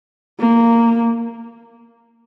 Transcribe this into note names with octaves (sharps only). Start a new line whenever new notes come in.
A#3